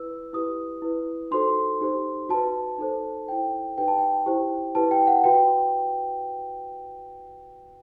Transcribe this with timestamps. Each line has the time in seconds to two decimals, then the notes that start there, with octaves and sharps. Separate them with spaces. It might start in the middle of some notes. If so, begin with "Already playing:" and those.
Already playing: E4 B4 E6
0.33 E4 G4 B4 D#6
0.82 E4 B4
1.31 D#4 F#4 A4 C5 C6
1.81 D#4 G4 C5
2.29 F#4 B4 A5
2.78 D#4 A4 C5
3.28 E4 A4 C5 G5
3.78 D#4 G4 B4 G5
3.88 A5
3.98 G5
4.26 E4 G4 C5
4.75 E4 G4 B4 A5
4.91 G5
5.07 F#5
5.24 F#4 B4 G5